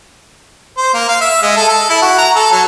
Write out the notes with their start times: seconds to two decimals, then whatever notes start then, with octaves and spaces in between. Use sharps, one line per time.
0.77 C5
0.94 A#3
1.08 F5
1.21 E5
1.43 G#3
1.57 A4
1.69 A4
1.90 E4
2.02 F#4
2.18 A#5
2.36 A4
2.52 F#3